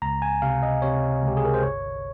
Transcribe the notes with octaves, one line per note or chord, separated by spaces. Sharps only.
C#2 A#5
G#5
C3 F5
D#5
C3 C#5
C#2
G4
G#4
A#4
C5
G1 C#5